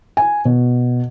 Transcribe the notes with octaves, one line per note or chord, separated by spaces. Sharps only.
G#5
B2